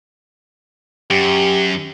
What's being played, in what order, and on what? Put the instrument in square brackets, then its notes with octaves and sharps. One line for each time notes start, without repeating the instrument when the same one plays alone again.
[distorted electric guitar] F#2 [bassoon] G4